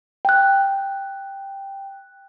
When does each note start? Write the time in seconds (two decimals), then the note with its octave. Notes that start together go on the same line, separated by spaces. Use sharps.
0.25 G5 F#6